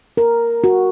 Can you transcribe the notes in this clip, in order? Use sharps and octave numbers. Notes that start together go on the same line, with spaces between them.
A#4
F#4